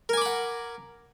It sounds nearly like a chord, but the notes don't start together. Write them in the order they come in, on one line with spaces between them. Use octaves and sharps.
A#4 G#5 D6 B5 F#5